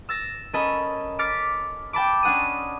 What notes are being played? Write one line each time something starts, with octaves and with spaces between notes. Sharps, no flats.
E6 A6 A#6
C#4 A4 A#4 D#5 B5
D6 F6 A6 B6 C#7
G5 A5 B5 D6
C#4 D4 F#5 D#6 D#7